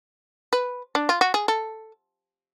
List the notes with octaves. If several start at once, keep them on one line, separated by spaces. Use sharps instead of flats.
B4
D4
F4
F#4
G#4
A4